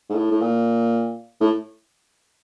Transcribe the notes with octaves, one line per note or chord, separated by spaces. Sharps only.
G#2
A2
A2
A#2
A2